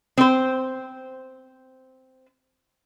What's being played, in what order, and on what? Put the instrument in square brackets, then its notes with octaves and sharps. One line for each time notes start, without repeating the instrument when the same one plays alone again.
[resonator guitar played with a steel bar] C4 C5